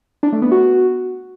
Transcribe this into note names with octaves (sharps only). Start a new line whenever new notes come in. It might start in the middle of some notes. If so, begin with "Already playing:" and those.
D4
A3
B3
F#4